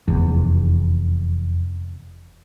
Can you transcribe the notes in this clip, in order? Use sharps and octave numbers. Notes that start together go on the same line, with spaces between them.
F1 E2